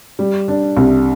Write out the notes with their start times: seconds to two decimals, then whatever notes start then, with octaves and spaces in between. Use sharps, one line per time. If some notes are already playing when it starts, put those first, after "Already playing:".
0.19 G3
0.48 D4
0.76 C2